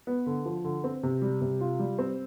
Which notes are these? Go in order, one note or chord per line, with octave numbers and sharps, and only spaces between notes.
B3
D3
F3
D3
C4
C3
G3
C3
F4
G3
C4